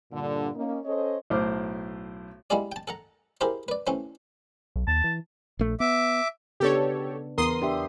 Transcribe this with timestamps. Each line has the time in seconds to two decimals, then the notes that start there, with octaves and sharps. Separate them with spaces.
0.12 G2 A#2 D3
0.55 A#3 C#4 D#4
0.85 C#4 A4 C5 C#5 D#5
1.30 B1 A2 C5 D6 F6
2.50 G3 G#3 E4 F4 G#4 D5
2.72 G5 A5
2.88 A4 F#5 A#5
3.41 E4 G4 G#4 A#4 C5
3.68 B4 D5
3.87 E3 A3 C4 C#4
4.76 B1
4.87 D#2 A5
5.04 E3
5.59 A#1 A3
5.80 B3 E5 D6
6.60 C#3 B3 D4 G4 A4 C#5
7.38 E2 B3 A#4 C6 D#6
7.62 D4 G4 E5